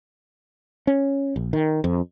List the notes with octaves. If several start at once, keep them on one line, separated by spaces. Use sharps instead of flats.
C#4
A#1
D#3
F2